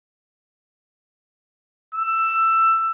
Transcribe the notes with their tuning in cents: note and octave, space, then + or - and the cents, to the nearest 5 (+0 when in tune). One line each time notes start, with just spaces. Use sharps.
E6 +15